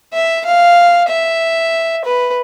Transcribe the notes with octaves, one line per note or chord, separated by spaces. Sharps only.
E5
F5
E5
B4